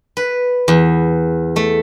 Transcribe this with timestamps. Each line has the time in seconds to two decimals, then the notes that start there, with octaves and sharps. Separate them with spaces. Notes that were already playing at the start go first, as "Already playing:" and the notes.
0.17 B4
0.68 E2
1.56 A3